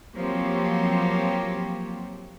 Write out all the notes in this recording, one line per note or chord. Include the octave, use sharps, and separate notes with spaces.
F3 F#3 A#3 C4 G4 C#5